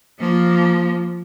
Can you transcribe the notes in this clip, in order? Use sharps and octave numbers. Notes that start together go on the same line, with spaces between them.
F3 A#3